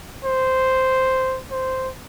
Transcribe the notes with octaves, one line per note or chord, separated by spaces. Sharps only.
C5
C5